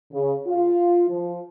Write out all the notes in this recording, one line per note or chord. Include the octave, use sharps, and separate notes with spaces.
C#3
F4
F3